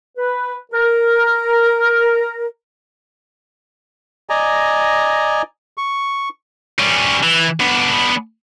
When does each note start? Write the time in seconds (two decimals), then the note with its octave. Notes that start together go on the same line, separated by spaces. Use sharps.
0.17 B4
0.72 A#4
4.30 D5 D#5 G#5 A#5
5.77 C#6
6.79 G3 C#4
7.23 E3
7.60 B3 D4